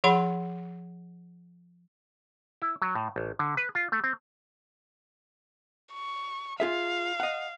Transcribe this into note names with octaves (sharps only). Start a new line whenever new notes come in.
F3 G#4 F#5 B5 C6
E4
F#3
A2
A1
D3
B4
F4
A3
C4
C#6
F4 G#4 E5 F5
D#5 F#5